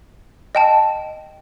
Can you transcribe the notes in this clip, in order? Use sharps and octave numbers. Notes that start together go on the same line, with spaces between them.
D#5 G5 A5